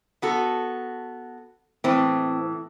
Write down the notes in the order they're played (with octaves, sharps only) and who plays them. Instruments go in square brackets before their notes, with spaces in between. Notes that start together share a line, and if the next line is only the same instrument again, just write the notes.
[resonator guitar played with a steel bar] B3 F#4 A4
[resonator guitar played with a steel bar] A2 E3 [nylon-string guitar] C4